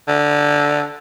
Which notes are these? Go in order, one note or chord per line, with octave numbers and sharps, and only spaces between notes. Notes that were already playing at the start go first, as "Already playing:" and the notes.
D3